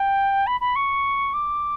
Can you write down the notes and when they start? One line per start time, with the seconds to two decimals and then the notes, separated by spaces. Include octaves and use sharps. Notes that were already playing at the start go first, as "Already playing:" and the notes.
Already playing: G5
0.47 B5
0.61 B5
0.76 C#6
1.33 D6